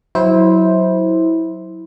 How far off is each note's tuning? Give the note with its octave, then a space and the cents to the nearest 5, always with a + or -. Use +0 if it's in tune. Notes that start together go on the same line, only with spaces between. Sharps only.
F#3 +0 E4 -20 C5 +0